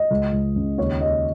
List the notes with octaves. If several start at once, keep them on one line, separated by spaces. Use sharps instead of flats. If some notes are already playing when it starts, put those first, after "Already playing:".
Already playing: D#5
C#2
C#2
C#3
D#2 C#5
D#2 D#5